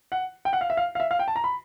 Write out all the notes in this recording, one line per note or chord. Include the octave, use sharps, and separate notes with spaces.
F#5
G5
F#5
F5
E5
F5
F5
E5
F5
G5
A5
A#5
B5